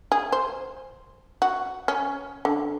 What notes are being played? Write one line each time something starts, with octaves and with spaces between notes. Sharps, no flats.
G#4
C5
F#4
C#4
D3